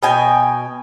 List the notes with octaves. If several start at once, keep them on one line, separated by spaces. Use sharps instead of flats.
B2 G5 G#5